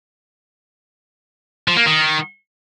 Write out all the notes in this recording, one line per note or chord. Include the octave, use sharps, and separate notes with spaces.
F3
A#3
D#3